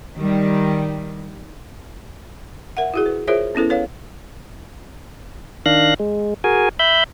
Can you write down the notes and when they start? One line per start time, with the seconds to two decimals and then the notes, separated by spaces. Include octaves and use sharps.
0.17 D#3 G3
2.77 A#4 E5 F#5
2.94 E4 F#4 G#4
3.06 B4
3.28 F4 G#4 A#4 C5 C#5 E5
3.55 B3 C#4 E4 A4 B4
3.70 A4 B4 C#5 F5
5.66 D#3 D4 F5 F#6 A#6
6.00 G#3
6.44 F#4 G#4 A#4 G#5
6.79 E5 B5 G6